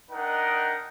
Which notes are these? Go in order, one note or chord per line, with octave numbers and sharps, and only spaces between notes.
D4 D#4 A#4 D#5 F#5 G5